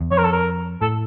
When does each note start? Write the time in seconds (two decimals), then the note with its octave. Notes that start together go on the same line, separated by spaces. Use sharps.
0.01 E2
0.11 F2 C#5
0.18 A#4
0.25 A4
0.33 A#4
0.81 A2 A4